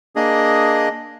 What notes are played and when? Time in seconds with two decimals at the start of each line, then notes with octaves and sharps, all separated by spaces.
0.15 A#3 D4 G#4 D#5